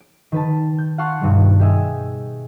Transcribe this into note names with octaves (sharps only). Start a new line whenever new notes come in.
D7
D#3 B4 A5
G6
F5 F#5 A5 C6 C#6 F6
G2 B2 D#3 G3
G4 G#4 D#5 E5 G#5